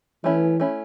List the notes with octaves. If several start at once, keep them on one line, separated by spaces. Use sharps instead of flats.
E3 A3 C#4 E4
A3 C#4 E4